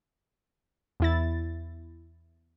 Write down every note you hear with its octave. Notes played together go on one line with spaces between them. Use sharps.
E2 E4 A6